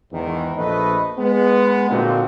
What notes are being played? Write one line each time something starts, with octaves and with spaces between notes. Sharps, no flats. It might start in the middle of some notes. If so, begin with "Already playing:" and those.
E2 G#2 D#3
A#1 A3 B4 D#5
G#3 B3
A#2 D3 C4 D#4 F4 F#4